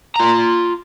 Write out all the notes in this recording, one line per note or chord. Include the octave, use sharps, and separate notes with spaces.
F4 A#5